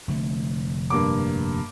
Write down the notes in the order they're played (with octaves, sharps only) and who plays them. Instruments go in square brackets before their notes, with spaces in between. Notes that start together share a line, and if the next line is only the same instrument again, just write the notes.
[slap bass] F1 D3 A3
[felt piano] G2 A#3 D6